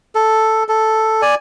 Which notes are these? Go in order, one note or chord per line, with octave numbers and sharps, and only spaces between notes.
A4
A4
D5 G#5